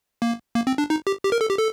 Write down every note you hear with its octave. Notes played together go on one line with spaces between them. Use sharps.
A#3
A#3
C4
D4
D#4
G4
G4
A#4
A4
G4
A4